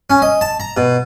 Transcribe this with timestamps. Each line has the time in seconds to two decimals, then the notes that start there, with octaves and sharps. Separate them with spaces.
0.10 C#4
0.22 D#5
0.41 A5
0.60 A#5
0.77 B2